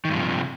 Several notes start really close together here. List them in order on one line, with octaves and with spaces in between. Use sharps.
D#3 G2 F3 C3